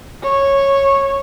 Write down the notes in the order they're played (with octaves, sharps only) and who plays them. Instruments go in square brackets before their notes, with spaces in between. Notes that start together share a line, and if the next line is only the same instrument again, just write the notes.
[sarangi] C#5